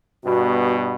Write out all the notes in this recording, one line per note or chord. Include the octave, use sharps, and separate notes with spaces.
G2 B2 B3 F#4